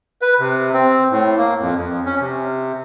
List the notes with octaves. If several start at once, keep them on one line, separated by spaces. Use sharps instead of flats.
B4
C3
C4
A2
A#3
F2
F2
C#4
C3